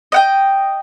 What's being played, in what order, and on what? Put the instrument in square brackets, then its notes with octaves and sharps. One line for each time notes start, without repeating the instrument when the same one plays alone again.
[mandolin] D#5 F#5 G5